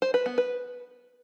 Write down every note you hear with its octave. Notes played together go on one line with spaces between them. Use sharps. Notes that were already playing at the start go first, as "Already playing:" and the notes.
C5
B4
B3
B4